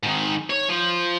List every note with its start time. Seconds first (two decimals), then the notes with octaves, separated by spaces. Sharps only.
0.03 G#2 D#3
0.50 C#5
0.69 F3